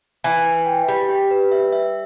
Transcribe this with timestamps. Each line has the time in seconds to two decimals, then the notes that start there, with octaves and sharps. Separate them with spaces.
0.24 E3 B4
0.46 B4
0.66 G5
0.88 G3 G4
1.09 G4
1.31 B4
1.52 E5
1.73 E5